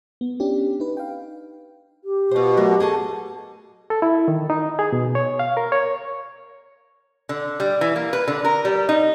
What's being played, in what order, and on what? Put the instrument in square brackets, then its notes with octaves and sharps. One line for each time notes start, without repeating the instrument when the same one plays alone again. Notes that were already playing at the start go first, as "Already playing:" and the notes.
[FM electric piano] B3
C#4 D4 G4
D#4 B4
F5 G5
[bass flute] G4
[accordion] B2 [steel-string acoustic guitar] F4 C5
[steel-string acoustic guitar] F#3 A3 A#4
G#4 A4 A5
[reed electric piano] A4
E4
D#3
D#4
G#4
B2
C#5
F5
A#4
C#5
[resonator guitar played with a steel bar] D3
G3
E3
A#3
B4
D3
A#4
G3
D#4